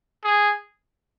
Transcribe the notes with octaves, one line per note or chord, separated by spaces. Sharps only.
G#4